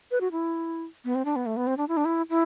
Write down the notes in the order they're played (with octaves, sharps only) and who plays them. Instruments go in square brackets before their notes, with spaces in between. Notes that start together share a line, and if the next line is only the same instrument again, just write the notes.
[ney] B4
F#4
E4
B3
C4
D4
B3
A3
B3
C4
D4
E4
D4
E4
E4